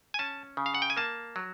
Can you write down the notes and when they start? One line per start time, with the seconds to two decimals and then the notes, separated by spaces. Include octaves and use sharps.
0.14 G#5
0.19 C#4 A5
0.57 C#3
0.66 F5
0.75 F#5
0.82 G5
0.90 G#5
0.97 A#3 A5
1.36 F#3